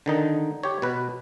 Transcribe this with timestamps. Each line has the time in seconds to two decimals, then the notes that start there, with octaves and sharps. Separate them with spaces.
0.06 D3 D#3 D#4
0.63 G4 C#5
0.82 B2 B4